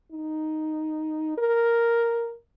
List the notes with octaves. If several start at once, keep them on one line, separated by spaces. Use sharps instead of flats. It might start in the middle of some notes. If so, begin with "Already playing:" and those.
D#4
A#4